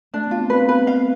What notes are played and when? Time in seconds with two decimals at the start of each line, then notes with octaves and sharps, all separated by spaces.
0.14 A3 D4
0.27 B3
0.31 F4
0.41 C4
0.50 B4
0.55 C4
0.69 B3 B4
0.87 F5